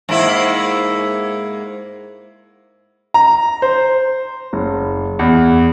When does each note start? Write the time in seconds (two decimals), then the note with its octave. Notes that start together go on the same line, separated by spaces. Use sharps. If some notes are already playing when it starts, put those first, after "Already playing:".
0.09 G#2 A#3 E4
3.14 A#5
3.62 C5
4.53 F#1
5.19 E2